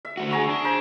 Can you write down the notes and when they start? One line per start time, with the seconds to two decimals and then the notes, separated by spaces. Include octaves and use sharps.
0.05 E5
0.17 D3 A3 F#4
0.31 G#4 A#5 C#6
0.49 D4
0.65 C5 A#5